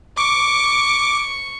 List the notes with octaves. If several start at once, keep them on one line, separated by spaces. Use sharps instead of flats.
C#6 D6